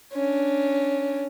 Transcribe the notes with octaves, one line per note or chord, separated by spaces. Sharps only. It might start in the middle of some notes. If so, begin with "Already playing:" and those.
C#4 D4